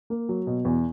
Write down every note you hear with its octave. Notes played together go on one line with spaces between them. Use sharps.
A#3
F#3
B2
E2